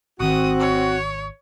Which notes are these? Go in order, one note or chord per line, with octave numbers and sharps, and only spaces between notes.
G#1 D#3 C4 F#4 D#6
C#5